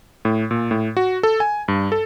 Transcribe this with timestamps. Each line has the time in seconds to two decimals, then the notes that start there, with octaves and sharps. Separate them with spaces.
0.25 A2
0.51 A#2
0.71 A2
0.97 F#4
1.23 A4
1.40 G#5
1.68 G2
1.92 A4